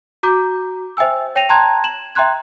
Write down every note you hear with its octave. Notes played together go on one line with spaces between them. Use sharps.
F#4 A#5 D6 G6
C5 E5 G5 G#5 E6
C#5 G5 A#6 D#7 F7
G5 A5 A#5 C6 F#6 G#6
E7 F#7
E5 G5 A#5 C6 F#6 G#6